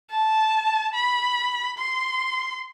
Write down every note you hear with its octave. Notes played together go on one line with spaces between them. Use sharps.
A5
B5
C6